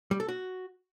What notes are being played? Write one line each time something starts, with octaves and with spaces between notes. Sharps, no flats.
G3
A4
F#4